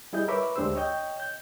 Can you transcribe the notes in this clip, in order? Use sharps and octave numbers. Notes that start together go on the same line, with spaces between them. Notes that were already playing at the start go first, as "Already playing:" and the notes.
G3 E4 G#4 D#5 G6
A#4 B4 C#5 E5 B5 D6
D2 G#3 D4 G4 C5 E6
C#5 D#5 G5 G6
G6